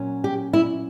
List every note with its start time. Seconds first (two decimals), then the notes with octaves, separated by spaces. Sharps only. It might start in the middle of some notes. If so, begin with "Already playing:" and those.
Already playing: A#2 F#3 C#4
0.24 G4
0.53 E4